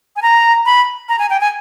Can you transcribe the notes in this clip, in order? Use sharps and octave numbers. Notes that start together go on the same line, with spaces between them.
G#5
A#5
B5
A#5
G#5
G5
G#5